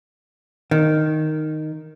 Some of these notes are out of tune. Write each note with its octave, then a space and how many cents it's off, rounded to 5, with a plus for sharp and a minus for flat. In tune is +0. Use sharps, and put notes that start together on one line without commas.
D#3 -5